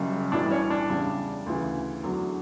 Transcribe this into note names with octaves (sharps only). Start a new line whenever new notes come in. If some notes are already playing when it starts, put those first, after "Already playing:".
Already playing: F#1 F#2 C#3 G3
B1 A2 E3 G3 D4
C#4
D4
E2 C#3 G3
D2 C#3 E3
E2 D3 F#3